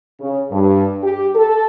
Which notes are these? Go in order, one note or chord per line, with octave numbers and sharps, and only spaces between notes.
C#3
G2
G4
A4